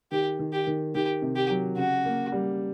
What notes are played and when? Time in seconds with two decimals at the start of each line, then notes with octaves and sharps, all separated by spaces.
0.11 D#3 G4
0.39 D#3
0.53 G4
0.67 D#3
0.95 D#3 G4
1.22 C3
1.36 G4
1.50 F#3
1.77 C#3 F#4
2.05 A#3
2.32 G3